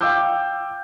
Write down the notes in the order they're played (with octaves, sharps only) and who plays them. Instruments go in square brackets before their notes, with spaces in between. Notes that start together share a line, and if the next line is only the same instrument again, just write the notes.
[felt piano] F5 G5 D6 E6 G6